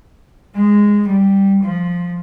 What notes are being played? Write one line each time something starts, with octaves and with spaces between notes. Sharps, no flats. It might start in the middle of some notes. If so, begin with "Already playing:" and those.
G#3
G3
F3